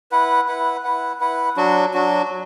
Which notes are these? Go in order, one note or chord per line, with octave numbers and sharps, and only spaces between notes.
E4 B4 F#5
E4 B4 F#5
E4 B4 F#5
E4 B4 F#5
F#3 D4 F#4
F#3 D4 F#4
F#3